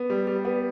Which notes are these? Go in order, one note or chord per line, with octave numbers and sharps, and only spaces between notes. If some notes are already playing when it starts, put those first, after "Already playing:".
Already playing: B3
G3
G3
B3